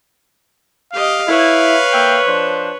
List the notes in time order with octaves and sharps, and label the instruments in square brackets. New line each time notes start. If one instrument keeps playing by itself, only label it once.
[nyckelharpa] G4 D#5 [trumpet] F5
[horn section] E4 [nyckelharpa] B4 C#5
[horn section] A#3 E5 G5
F3 D4 C5